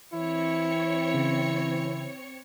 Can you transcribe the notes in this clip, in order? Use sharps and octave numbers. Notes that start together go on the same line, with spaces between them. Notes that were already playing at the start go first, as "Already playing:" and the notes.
E3 C4 E4 C#5 C#7
C#3